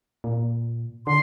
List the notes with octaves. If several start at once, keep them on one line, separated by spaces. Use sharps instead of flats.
A#2
D3 C6